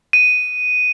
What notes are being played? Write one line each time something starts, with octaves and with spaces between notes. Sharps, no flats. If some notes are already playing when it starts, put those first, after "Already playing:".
D#7